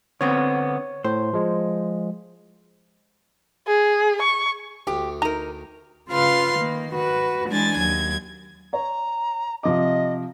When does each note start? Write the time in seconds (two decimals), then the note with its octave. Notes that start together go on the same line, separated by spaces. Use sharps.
0.21 D3 B3 C4 C#5
1.04 A2 C5
1.33 F3 G#3
3.68 G#4
4.22 C#6
4.87 D2 G4
5.22 D#4 A#4 A#5
6.08 C#3 F4 B4 F5 C6 F6
6.54 D#3 A#3
6.93 F#4 B4
7.48 E3 G#3 D4 G#5 A6
7.78 D#2 F#3 G#6
8.73 C#5 A#5
9.63 C3 F3 D#5 D6